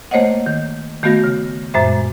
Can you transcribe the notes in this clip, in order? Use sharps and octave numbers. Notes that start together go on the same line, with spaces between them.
A3 A#3 C5 C#5 D#5 F#5
D#3
D#3 A3 B3 F#4 F5 A#6
C#3
F#2 A#2 G#3 C5 E5